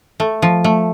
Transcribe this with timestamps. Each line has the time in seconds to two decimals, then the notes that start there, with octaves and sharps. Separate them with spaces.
0.20 A3
0.42 F3
0.64 A3